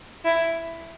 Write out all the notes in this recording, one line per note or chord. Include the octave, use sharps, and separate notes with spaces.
E4